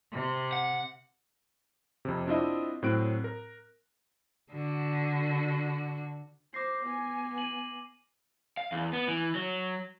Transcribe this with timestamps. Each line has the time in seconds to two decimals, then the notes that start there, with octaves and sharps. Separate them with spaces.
0.12 C3
0.53 F#5
2.05 F2 C3
2.27 C4 D4 E4 F4 D#5 E5
2.82 A2 F#3 C4 F#6 D7
3.24 A#4
4.52 D3 F#4
6.54 C5 D6 A#6 C7
6.82 B3 G#5
7.38 D#7 F#7
8.57 F5
8.72 E2
8.93 B3
9.08 E3
9.35 F#3